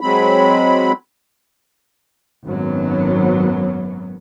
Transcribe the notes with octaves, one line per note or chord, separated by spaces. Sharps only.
F#3 G#3 C4 B5
G#1 F#2 F#3 B3